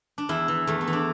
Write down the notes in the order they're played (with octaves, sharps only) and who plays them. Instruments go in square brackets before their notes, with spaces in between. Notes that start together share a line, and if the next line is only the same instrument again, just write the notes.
[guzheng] D4
E2 E4
E3
E2 A3
B3
E3
D4